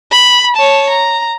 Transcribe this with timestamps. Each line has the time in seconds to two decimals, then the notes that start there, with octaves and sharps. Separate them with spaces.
0.11 B5
0.55 C#5 A5
0.89 A#5